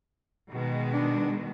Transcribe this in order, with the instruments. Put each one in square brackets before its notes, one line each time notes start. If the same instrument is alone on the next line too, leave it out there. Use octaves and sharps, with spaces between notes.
[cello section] B2 D#3 G#3
[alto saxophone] D4